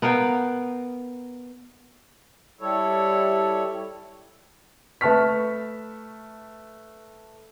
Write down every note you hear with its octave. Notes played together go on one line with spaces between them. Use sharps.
B3 A#4 F5 G5
G3 E4 A4 C#5
A3 B4 A5 C#6 F6 B6